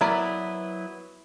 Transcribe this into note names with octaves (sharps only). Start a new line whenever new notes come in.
F#3 B3 E4 A#4 B4 D5